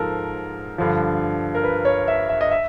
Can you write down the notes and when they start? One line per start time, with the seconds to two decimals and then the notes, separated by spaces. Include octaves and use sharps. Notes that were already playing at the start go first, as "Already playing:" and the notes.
Already playing: G#2 F3 A4 A#4
0.78 G2 D3 F3
1.55 A#4
1.64 B4
1.85 C#5
2.08 E5
2.29 E5
2.41 D#5
2.51 E5